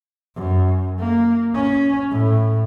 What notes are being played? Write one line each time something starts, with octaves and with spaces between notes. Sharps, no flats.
F#2
A#3
C#4
A2